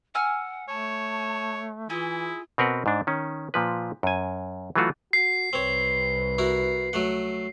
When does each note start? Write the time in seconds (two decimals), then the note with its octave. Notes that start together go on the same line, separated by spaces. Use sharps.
0.15 F#5 G#5 E6 F6
0.69 A3 C#5 A5
1.90 E3 E4 F4 G#4
2.58 B2 C4 A#4 B4 F#5
2.86 G#2 D4
3.07 D#3 C#4
3.54 A#2 F3 B4
4.03 F#2 G#5
4.76 E3 F#3 A3 F4 F#4
5.13 F#4 C7
5.53 C2 C4 B4 C#5
6.38 E4 F#4 A#4
6.93 F#3 A3 F#5